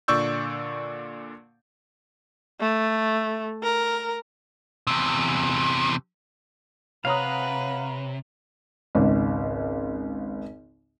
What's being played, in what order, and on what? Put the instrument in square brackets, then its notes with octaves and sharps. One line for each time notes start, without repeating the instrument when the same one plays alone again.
[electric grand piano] A#2 D3 D5 C#6 E6 G6
[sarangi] A3
A#4
[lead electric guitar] E2 C3
[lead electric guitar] C3 [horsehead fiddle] B4 [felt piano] C#5 A#5 D#6 [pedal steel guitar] F5 F#5
[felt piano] G#1 C#2